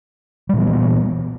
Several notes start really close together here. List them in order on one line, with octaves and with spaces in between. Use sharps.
G3 A#2 E3 B3